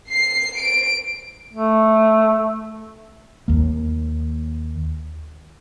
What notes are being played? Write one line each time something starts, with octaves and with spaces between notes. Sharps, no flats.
C7
D7
A3
D#2 A#3